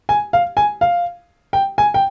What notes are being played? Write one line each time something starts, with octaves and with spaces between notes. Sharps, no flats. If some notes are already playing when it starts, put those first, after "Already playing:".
G#5
F5
G#5
F5
G5
G#5
G5